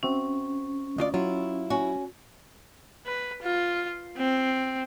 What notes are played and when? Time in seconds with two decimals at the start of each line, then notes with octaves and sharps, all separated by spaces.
0.03 C4 C#4 F#4 E5
0.98 D2 F4 D5 D#5
1.14 F#3 E4 F4
1.70 C#4 F#4
3.06 B4
3.42 F4
4.17 C4